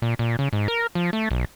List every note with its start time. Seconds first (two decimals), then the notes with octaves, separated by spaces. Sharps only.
0.02 A#2
0.19 A#2
0.39 C#3
0.53 G#2
0.68 A#4
0.95 F3
1.13 A3
1.31 B1